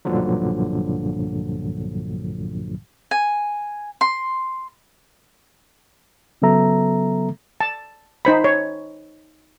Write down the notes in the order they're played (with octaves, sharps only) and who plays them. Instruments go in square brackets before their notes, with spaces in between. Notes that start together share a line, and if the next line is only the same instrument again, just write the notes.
[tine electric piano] B1 G2 A#2 D3 F3 F#3
[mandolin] G#5
C6
[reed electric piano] C#3 F#3 B3 A4 E5 A#5
[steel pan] A5
D#4 C5 B5
C#5